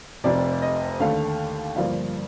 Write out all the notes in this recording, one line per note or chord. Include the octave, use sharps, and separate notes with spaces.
F1 F2 C3 D5
D#5
D#2 D3 A3 F5
G1 G2 F3 A#3 F5